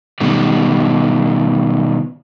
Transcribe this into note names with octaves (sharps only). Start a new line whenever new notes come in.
B2 D#3 G3